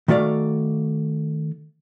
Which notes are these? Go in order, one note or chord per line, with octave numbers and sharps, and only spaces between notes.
D#3 A3 F#4 D5 F5